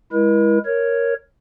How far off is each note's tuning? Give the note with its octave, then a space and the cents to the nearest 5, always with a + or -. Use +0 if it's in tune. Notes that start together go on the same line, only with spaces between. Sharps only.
G#3 -10 E4 +0 A#4 +45
A#4 +0 C#5 +0